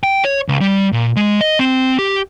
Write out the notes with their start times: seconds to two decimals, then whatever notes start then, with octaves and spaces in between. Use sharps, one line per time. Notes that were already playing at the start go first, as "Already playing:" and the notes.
0.03 G5
0.24 C#5
0.49 C#2
0.61 G3
0.92 A#2
1.16 G#3
1.41 D#5
1.59 C4
1.99 G4